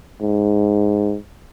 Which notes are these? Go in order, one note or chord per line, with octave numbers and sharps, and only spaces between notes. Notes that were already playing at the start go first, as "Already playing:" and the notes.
G#2